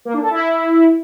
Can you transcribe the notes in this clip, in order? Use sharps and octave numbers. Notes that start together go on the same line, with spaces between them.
A#3
D4
A4
E4